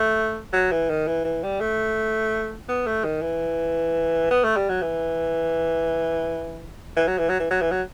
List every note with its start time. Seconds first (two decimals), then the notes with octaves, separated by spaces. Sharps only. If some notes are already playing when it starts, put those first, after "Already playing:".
Already playing: A3
0.53 F#3
0.71 E3
0.89 D#3
1.07 E3
1.24 E3
1.43 G3
1.60 A3
2.68 B3
2.86 A3
3.04 D#3
3.22 E3
4.30 B3
4.44 A3
4.56 G3
4.69 F#3
4.82 E3
6.96 E3
7.07 F#3
7.18 E3
7.29 F#3
7.40 E3
7.50 F#3
7.61 E3
7.71 F#3